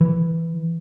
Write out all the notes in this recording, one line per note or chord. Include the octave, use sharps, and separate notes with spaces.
E3